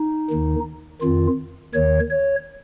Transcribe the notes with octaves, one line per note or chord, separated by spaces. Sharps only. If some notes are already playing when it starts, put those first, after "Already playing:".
Already playing: D#4
D#2 D#3
F2 D#3 F4
D#2 D#3 C#5
C#5